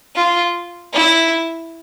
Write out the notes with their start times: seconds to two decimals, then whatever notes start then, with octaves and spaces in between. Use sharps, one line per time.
0.15 F4
0.94 E4